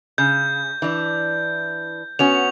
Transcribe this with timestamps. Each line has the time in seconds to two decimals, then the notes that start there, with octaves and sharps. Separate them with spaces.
0.18 C#3 G6
0.82 E3 D4
2.19 B3 C#4 F#4 F7